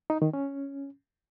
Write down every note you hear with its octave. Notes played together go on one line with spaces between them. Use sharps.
D#4
D#3
C#4